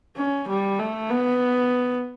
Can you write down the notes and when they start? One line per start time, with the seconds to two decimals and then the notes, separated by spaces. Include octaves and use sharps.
0.16 C#4
0.48 G3
0.79 A3
1.11 B3